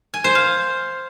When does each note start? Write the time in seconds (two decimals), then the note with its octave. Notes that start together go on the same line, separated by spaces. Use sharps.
0.14 G#5
0.24 C5
0.35 F5